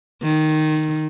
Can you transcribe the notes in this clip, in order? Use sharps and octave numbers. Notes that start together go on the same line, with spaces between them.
D#3